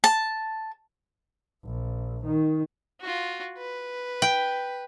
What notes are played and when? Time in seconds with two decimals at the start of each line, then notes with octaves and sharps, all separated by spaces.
0.04 A5
1.64 A#1
2.25 D#3
3.01 F4 F#4
3.58 B4
4.22 G5